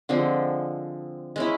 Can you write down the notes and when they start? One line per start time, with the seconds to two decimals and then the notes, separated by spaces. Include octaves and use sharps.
0.09 D3 F3 G#3 C4
1.36 G#3 C#4 E4